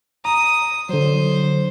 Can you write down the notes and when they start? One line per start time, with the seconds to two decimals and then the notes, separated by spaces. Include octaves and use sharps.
0.25 A#5 D#6
0.89 D3 F#3 C5